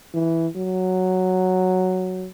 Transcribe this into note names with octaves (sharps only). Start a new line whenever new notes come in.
E3
F#3